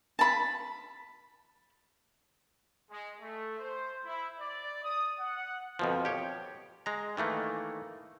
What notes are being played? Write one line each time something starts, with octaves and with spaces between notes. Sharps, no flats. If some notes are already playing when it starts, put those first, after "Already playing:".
A5 B5
G#3
A3
C5
E4
D5
D#6
F#5
F2 B2 F3
G4 C#5
G#3 A#5
D#3 E3 A3 A#3